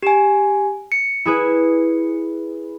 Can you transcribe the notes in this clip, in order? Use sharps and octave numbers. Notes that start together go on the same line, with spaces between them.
G4 G#5 E7
C#7
E4 G#4 B4